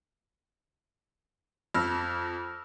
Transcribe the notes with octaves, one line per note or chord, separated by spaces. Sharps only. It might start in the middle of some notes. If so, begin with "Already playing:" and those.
F2 E6 F6 A#6